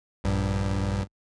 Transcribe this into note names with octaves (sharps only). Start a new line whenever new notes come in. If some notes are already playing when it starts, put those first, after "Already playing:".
A#1 G2